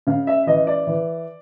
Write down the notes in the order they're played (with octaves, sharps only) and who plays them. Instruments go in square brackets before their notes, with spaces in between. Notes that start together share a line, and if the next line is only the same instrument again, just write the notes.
[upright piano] C#3 F5
E5
E3 D#5
D5
E3